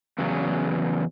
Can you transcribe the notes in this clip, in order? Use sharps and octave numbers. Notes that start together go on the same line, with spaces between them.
E2 C#3 F#3